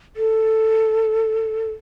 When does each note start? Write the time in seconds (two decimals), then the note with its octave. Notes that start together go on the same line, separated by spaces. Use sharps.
0.16 A4